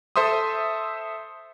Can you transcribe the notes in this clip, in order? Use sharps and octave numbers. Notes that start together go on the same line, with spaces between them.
A4 C5 E5 C6 D#6